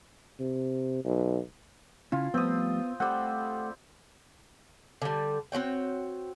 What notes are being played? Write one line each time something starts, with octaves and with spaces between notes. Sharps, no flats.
C3
B1
C#3 C#4 E4 F4
F3 G3 A3 B3 C4 D#6
G3 A3 C4 A4 F#5 G5
D3 G3
C4 F#4 C#5 G5